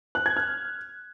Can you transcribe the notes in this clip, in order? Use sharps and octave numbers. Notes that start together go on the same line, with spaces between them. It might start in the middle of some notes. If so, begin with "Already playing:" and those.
F#6
G#6
F6